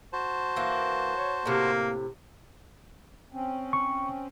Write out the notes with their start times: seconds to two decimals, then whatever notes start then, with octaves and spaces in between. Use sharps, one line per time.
0.13 F#4 C5 A5
0.56 E3 A#3
1.13 C#5
1.46 A2 C3 A#3
3.32 C4 C#4
3.73 C#6